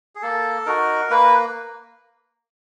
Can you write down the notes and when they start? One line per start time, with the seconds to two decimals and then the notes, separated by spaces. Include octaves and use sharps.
0.15 G#4
0.22 A#3 A4
0.66 D#4 F#4 A#4
1.10 A#3 B4